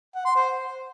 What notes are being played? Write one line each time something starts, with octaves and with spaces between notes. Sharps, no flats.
F#5
C6
C5